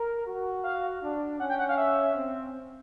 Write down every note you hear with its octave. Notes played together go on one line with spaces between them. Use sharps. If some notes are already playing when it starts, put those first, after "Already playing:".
Already playing: A#4
F#4
F5
D4
C#4 F#5
G5
F#5
F5
E5
C4